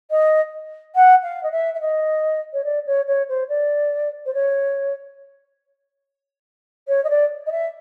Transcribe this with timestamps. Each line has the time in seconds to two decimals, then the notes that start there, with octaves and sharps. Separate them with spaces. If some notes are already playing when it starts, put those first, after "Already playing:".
0.11 D#5
0.96 F#5
1.23 F5
1.43 D#5
1.52 E5
1.74 E5
1.81 D#5
2.53 C#5
2.64 D5
2.87 C#5
3.08 C#5
3.29 C5
3.49 D5
4.26 C5
4.34 C#5
6.88 C#5
7.04 D#5
7.10 D5
7.46 D#5
7.52 E5